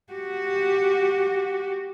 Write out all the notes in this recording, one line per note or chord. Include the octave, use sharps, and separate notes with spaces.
F#4 G4